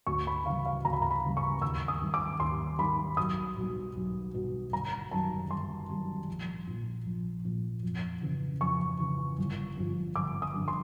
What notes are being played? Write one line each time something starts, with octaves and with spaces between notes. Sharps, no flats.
D2 C#6
B5
C#3 E3 G3 F5
F5
D2 A#5
B5
A#5
B5
C#3 E3 G3
C#6
D#2 E6
D#6
D#3 G3
D6
D#2 C6
D#3 G3 B5
B1 D#6
B2 G3
B1
B2 G3
G1 A#5
F#2 D#3 G3 A5
G1 C6
F#2 D#3 G3
A#1
A#2 F3
A#1
A#2 F3
F2
C#3 E3
F2 C#6
C#3 E3
G1
G2 D3 F3
G1 D6
D#6
G2 D3 F3
C6